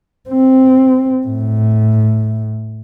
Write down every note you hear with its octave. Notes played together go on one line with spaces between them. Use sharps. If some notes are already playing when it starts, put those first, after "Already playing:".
C4
A2